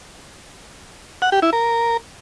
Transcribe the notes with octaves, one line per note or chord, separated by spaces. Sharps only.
F#5
G4
E4
A#4